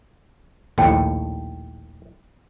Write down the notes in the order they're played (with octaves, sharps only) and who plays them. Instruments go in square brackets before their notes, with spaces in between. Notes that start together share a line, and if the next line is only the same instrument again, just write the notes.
[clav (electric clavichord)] A#1 D#2 A2 [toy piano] G5 A5